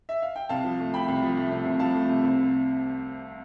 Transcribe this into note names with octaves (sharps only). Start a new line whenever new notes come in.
E5
F5
G5
C2 F5 A5
F3
A3
C3 G5 B5
C2
F3
A3
C3
C2
F3 F5 A5
A3
C3
C2